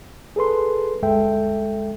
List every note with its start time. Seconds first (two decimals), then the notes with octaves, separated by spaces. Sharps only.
0.36 G#4 A4 B4 C6
1.02 D2 G2 G#3 A4 E5 G5